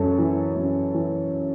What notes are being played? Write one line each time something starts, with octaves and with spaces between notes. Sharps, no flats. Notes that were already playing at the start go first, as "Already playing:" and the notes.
Already playing: F#2 E3 A4 C#5
E3
F#2
E3